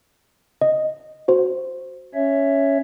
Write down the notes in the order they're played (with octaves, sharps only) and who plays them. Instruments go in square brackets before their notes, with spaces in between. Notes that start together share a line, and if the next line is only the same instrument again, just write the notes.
[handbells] D#5
F#4 C5
[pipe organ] C#4 C#5 E5